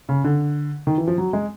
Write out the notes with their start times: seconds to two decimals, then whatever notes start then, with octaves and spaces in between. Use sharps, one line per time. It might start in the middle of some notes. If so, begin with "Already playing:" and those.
0.09 C#3
0.24 D3
0.87 D#3
0.98 E3
1.07 F3
1.18 F#3
1.33 G#3